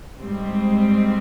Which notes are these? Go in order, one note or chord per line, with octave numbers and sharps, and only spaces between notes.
G#2 G3 C4